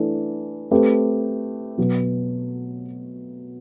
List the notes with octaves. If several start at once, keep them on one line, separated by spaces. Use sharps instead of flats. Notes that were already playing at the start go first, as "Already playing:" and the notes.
Already playing: E3 A3 D4 A4
A3 C4 G4 B4
B2 F#3 B3